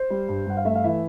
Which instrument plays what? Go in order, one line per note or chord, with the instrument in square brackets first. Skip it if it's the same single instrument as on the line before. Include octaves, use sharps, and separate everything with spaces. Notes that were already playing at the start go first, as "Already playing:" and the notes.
Already playing: [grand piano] C5
G3
G2
G2 F#5
F5
A3 E5
F5
E3 E5